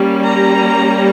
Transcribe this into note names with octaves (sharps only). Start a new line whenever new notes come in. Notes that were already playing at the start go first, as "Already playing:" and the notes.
Already playing: G3 A#3 C#4
A#5